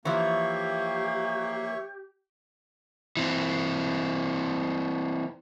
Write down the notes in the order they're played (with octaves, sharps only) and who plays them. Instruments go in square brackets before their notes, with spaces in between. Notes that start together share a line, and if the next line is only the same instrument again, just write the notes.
[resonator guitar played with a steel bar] E3 F3 [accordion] A#3 [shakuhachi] G4 [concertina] C#5 E5 C#6
[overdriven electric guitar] E3 C4